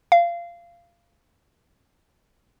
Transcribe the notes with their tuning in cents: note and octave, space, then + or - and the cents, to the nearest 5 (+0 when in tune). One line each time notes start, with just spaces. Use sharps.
F5 -20